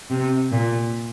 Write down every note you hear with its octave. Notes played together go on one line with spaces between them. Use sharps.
C3
A#2